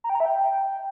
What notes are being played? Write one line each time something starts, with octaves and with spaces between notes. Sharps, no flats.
A#5
G5
A#5
E5
G5